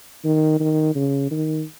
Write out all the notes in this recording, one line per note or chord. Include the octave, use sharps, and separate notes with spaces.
D#3
D#3
C#3
D#3